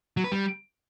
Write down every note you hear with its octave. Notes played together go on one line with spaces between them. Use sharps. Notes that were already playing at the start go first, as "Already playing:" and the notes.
F#3
B4
G3